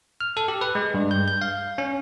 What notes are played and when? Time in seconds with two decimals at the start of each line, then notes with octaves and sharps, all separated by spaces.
0.21 F6
0.37 A4
0.48 G4
0.61 B4
0.75 G#3
0.94 G2
1.11 G6
1.28 G6
1.41 F5
1.78 C#4